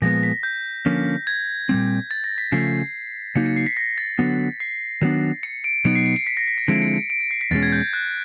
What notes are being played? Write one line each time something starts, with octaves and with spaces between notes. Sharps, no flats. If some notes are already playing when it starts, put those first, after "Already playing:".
A#2 F3 G#3 B3 A#6
B6
G6
D3 F3 A#3 C#4
G#6
A#2 G3 C4
A6
A#6
B6
C#3 F3 A3 C7
C#3 F#3 A#3 D#4 C#7
C#7
C7
B6
A#6
A6
D3 F#3 B3
C7
D#3 F#3 B3 D4
C#7
D7
B2 F#3 B3 D#4 C#7
C7
C#7
C#7
B6
A#6
B6
C#7
D3 F3 G#3 C4 E4 D7
C#7
C#7
D7
C#7
C7
B6
E2 B2 G#3 C#4 A6
G#6
G6
F#6